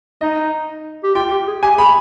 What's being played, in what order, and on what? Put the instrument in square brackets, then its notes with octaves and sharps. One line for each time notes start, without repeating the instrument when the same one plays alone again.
[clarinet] D#4 [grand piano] D#5
[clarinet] G4
[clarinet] F4 [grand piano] G5
[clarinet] G4
G#4
[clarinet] G4 [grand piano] G#5
[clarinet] G#4 [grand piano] B5